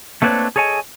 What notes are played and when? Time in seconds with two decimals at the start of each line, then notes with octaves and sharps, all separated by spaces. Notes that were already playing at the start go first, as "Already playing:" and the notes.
0.22 A3 A#3 C4 D4 B4 C#5
0.56 G#4 A4 C#5 D#5 G#5